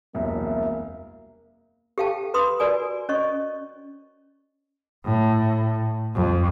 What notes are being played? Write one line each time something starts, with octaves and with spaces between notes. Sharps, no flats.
E1 C2 F#2 A#3 E5
G4 A4 F5 G5 A5
B4 B5 C6 D#6
F#4 A#4 D5 G#5 D#6
C#4 C#5 D#5 C#6
A2
F2